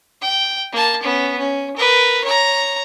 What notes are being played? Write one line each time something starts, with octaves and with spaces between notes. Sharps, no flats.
G5
A#3 A5
B3 C#4
C#4
A#4 B4
C#5 A#5